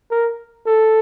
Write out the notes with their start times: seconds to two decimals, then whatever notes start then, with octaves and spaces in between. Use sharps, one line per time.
0.11 A#4
0.66 A4